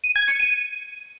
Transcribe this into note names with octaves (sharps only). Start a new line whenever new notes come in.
D#7
G#6
C#7
D#7